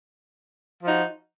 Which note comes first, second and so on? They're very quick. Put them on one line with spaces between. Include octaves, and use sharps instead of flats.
F3 D#4 F#4